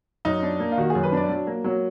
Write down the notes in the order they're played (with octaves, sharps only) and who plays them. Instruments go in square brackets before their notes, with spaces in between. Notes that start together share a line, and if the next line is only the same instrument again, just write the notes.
[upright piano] F#2 [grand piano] D#4
[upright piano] D4
A#3
[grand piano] F4
[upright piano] D#3 [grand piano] F#4
[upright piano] F#2 [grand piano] G#4
[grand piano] B4
[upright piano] D4 [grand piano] D5
[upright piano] F#3
A#3
F#3